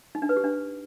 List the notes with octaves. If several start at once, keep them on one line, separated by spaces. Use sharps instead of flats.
D#4
D4
B4
G4
D4